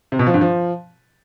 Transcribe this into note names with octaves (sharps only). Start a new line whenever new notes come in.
C3
B2
F3
G2
F3